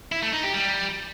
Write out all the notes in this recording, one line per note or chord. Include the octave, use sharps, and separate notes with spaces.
E4
A3
D#4
G4
G3